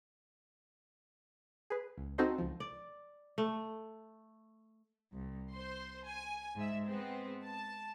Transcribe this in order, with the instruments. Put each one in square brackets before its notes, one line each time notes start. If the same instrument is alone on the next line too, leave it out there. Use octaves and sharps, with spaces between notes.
[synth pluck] G#4 B4
C#2
C4 D#4 F#4 A4 C5 D#5
C#2 F3
[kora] D5
A3
[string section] C2
C5 C6
G#5
G#2 E5
G#3 B3 C4
A5